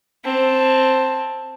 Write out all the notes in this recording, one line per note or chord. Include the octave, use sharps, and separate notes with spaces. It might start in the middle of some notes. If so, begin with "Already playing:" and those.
C4 A5